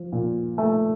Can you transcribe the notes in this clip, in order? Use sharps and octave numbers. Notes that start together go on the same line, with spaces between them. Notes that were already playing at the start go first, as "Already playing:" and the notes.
Already playing: F3
A#2
A3